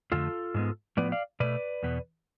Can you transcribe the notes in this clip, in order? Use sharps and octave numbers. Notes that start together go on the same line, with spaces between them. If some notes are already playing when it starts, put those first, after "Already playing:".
F2 D3 F3 A3 F4 A4
G#2 G#3 B3
A2 F3 B3 B4 D5
D5 F5
B2 A3 B4 D5
E2 B2 B3